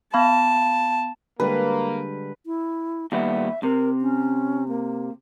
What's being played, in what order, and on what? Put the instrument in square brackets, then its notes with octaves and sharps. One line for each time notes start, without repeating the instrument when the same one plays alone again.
[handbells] B3 F5 B5 [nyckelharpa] A5
[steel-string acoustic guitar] D3 G3 G#3 [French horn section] A#3 [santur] B4
[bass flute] E4
[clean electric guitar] D#2 G3 B3 [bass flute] E5
[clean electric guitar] C3 [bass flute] A#4
[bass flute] C#4
A#3